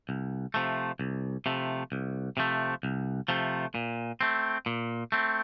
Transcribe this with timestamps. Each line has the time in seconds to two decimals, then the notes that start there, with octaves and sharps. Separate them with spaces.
0.09 C2
0.54 C3 F3 A3
1.00 C2
1.46 C3 F3 A3
1.92 C2
2.37 C3 F3 A3
2.83 C2
3.28 C3 F3 A3
3.75 A#2
4.21 A3 C4
4.66 A#2
5.12 A3 C4